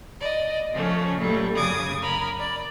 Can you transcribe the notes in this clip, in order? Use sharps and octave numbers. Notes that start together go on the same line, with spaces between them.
D5 D#5
C#3 F3 A3 C#4
A#2 F#3 G3 A3
F#2 C#3 D6 D#6 G#6
A#4 B5
D5